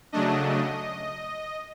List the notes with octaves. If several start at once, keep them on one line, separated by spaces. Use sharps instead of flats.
C#3 F#3 A3 D4 D#5